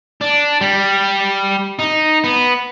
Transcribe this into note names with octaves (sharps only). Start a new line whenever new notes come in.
D4
G3
D#4
B3